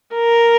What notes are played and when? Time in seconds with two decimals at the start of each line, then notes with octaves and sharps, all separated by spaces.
0.15 A#4